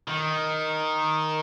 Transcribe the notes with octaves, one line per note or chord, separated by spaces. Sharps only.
D#3